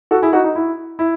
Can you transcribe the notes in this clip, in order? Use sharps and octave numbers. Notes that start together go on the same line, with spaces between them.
F#4 A4
E4 G#4
D#4 F#4
D#4
E4
E4